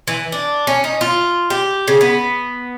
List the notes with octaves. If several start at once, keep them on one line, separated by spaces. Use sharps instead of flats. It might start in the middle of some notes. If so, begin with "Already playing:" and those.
E3
D4
C#4
D#4
F4
G4
C#3
B3